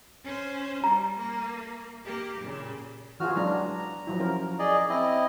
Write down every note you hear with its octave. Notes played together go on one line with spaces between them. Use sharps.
C#4 C5
G3 A#5
A#3
A#3 G4
A#2 C#3
E3 F4 F#4 G#4 F6
F#3 G#3 D4 A#5
F3 F#3 E4
C#4 A#4
G#4 D5 D#5
C4 E4 D#5